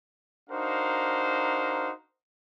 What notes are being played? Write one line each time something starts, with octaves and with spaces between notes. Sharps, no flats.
D4 D#4 F#4 A#4 C5 F5